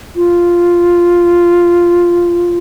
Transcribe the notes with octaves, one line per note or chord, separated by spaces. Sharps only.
F4